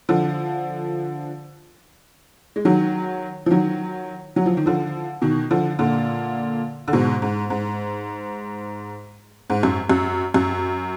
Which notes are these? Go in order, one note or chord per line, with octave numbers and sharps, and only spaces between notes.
D3 F3
G#3
D#3 F#3
F3
D#3 F#3
F#3
F3
D#3
D3 F3
B2 D#3
D3 F3
A#2 D3
D3
G#2 B2
G#2
G#2
G#2
F#2
F#2
F#2